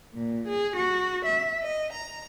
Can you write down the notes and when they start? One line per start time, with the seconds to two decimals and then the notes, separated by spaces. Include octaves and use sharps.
0.13 A#2
0.47 G#4
0.76 F#4
1.25 E5
1.62 D#5
1.92 A#5